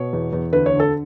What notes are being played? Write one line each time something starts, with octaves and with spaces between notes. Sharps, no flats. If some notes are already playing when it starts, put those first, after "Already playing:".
Already playing: B2 C#5
E2
E2
D2 B4
C#5
D3
A4